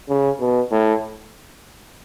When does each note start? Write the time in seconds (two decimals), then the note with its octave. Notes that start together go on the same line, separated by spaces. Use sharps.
0.09 C#3
0.40 B2
0.72 A2